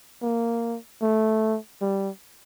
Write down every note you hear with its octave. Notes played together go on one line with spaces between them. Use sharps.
A#3
A3
G3